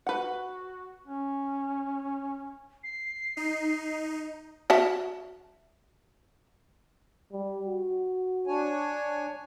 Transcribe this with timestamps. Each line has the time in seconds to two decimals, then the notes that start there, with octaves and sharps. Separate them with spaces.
0.07 F#4 B4 F#5
1.07 C#4
2.84 C7
3.37 D#4
4.70 F#4 E5 A5
7.32 G3
7.67 F#4
8.47 D4 C#5 G#5